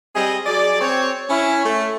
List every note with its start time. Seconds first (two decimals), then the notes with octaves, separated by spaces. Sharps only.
0.15 G3 C4 G#4 D#5
0.46 F#3 G#4 D5
0.81 C4 C#5
1.29 C#4 E4
1.66 A3